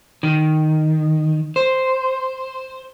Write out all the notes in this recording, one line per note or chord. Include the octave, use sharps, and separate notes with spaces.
D#3
C5